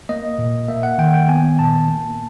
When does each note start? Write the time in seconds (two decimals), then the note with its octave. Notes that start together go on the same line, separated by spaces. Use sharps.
0.09 A#3 D#5
0.38 A#2
0.68 A#3 E5
0.83 F#5
0.98 D#3 G5
1.14 G5
1.28 B3 G#5
1.59 A#2 A5
1.88 A#3